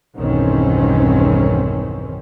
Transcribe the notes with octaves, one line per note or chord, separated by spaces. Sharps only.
B1 E2 G2 D#3 C4 C#4